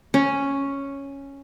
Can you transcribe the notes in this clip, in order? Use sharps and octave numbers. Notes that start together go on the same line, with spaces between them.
C#4